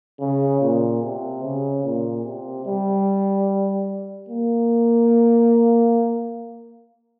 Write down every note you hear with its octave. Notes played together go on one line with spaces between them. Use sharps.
C#3
A#2
C3
C#3
A#2
C3
G3
A#3